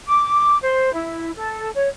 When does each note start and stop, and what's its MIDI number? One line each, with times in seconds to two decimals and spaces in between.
0.07 0.57 86
0.63 0.92 72
0.93 1.31 64
1.36 1.70 69
1.75 1.88 73